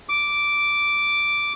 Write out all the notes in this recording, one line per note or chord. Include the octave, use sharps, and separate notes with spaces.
D6